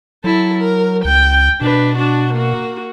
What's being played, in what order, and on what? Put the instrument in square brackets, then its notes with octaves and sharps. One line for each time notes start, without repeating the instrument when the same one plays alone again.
[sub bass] F#3 [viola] E4 A4
[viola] A#4
[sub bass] C#2 [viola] G5
[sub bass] B2 [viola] D4 B4
[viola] D4 F#4
A#3 F#4